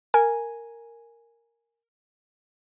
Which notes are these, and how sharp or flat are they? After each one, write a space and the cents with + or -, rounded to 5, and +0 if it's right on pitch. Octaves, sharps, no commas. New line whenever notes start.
A#4 -5 G#5 +0